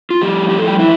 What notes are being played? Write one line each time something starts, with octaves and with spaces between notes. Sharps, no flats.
F4
A2 F3 G3 G4
G4
A4
G3 G4
E3 E4